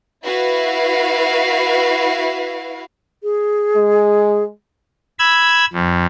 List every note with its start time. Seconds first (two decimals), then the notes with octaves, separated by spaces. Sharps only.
0.23 E4 F#4 B4 F5
3.23 G#4
3.76 G#3
5.19 B5 E6 G#6
5.73 F2